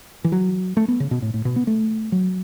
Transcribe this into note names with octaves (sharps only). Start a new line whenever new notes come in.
E3
F#3
A3
B3
C#3
B2
A2
A2
B2
B3
A3
F#3